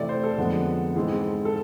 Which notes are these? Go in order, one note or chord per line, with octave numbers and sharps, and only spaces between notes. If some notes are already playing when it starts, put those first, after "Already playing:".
Already playing: C3 E3 A3 C4 D5
C5
A4
F2 D3 G#3 B3
G#2 E3 G#3 C4
A4